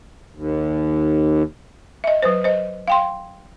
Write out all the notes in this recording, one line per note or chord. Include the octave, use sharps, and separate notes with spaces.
D#2
D#5 E5
F#3 B4 C5
C5 D#5
F5 G5 C6